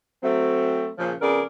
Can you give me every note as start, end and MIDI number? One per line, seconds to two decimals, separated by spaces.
0.23 0.89 54
0.23 0.89 57
0.23 0.89 60
0.97 1.12 46
0.97 1.12 49
0.97 1.12 53
1.21 1.42 41
1.21 1.42 49
1.21 1.42 59
1.21 1.42 68
1.21 1.42 70
1.21 1.42 74